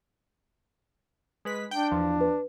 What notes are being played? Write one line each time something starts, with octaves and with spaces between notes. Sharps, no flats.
G#3 B4 B6
D4 G5
E2 F3
B4